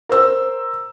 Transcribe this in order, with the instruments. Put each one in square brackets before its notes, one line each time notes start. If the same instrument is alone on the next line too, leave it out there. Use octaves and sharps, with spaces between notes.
[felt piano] A#4 C5 E6